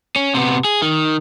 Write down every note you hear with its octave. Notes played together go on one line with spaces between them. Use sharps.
C#4
C3 B3
G#4
D#3